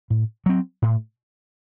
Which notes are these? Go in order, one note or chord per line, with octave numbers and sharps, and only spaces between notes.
A2
F#3 C4
A2